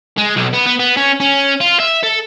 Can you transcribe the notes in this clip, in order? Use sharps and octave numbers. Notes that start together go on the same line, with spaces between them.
G#3
B1
B3
B3
B3
C#4
C#4
F4
E5
A4